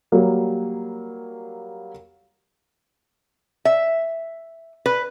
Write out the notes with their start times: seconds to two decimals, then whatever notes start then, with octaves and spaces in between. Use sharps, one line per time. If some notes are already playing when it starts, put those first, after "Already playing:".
0.12 F#3 G3 A#3
3.65 E5
4.86 B4